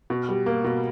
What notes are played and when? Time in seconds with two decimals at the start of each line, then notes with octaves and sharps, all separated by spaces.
0.10 B2
0.29 G3
0.46 A#3
0.64 B2